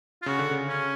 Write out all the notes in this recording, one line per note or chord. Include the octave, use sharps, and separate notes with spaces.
F4
C#3 F#4
D3
C#3
C#4